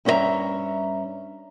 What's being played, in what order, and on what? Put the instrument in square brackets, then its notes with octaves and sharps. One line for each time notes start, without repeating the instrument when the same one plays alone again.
[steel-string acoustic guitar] G2 C#4 D4 A4 E5 A#5